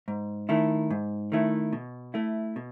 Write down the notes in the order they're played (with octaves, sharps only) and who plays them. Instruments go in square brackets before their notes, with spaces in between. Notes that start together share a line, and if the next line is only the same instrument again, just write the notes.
[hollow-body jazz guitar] G#2
D#3 A3 E4
G#2
D#3 A3 E4
B2
A3 E4
B2